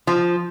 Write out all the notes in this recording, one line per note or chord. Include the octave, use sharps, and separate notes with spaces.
F3